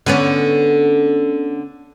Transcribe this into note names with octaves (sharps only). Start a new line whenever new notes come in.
D3 B3 C#4